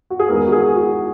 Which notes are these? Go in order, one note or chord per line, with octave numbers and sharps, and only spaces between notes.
F#4
G#4
E2 D#3 G#3 B3 A#4
F#4
G#4
F#4